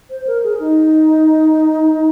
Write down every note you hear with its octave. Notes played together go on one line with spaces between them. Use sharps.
C5
A#4
G#4
D#4